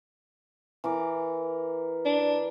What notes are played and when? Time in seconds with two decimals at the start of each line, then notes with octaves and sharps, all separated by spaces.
0.84 E3 A#4 D6
2.05 D4